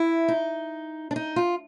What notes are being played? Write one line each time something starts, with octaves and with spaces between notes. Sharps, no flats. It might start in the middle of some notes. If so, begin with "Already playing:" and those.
Already playing: E4
D#4
D4
D#4
F4